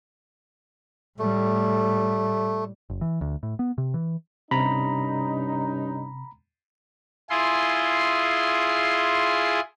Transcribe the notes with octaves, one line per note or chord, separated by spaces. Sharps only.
A2 G3 A3
F#1
E3
D2
A2
B3
C3
E3
G2 C3 C#4 D#4 A#5 B5
E4 F4 G#4 C6